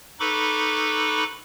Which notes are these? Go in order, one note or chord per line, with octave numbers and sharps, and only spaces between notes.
D#4 A4 B4 B5 C#6 D6